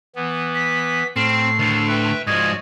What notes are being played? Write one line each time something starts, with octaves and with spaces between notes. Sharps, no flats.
E3 B3
B6
A2 C4 F6 C7
D2 D3 D#3 A6
B4 E5 G5
G#2 F3 F#4 D5 D#5 G#6